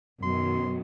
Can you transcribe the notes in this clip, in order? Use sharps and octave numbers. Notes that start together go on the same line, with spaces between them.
F#2 B2 D#3 F#3 C6